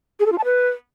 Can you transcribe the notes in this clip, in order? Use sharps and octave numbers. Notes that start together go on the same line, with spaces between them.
G#4
A4
F4
A5
B4